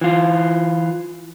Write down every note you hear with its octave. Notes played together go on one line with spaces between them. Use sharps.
E3 F4